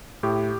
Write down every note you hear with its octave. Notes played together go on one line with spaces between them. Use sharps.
A2 G4